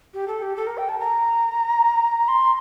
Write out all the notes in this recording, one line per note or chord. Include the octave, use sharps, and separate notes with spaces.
G4
A4
G4
A4
A#4
G5
A5
A#5
C6